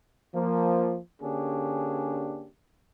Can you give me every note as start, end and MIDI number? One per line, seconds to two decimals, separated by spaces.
0.34 0.97 53
0.34 0.97 58
1.22 2.47 50
1.22 2.47 58
1.22 2.47 61
1.22 2.47 62
1.22 2.47 67
1.22 2.47 68